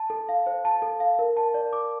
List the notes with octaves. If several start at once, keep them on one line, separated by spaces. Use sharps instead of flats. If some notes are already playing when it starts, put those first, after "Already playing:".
Already playing: A5
A4
F5
C5
A5
A4
F5
A#4
A5
D5
D6